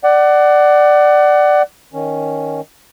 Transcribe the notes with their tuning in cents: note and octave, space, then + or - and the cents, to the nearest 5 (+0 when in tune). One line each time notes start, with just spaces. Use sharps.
D5 +10 F#5 +25
D#3 +0 C#4 +0